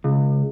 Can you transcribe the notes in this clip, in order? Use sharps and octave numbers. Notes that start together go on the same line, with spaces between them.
C#2